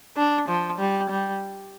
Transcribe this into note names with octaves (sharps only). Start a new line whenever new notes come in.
D4
F3
G3
G3